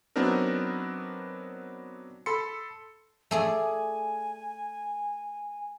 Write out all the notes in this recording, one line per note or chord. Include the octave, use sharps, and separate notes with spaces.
F#3 B3 C4 D4 D#4 A#4
A4 B5 C6 C#7
A3 G#4 D5 G#5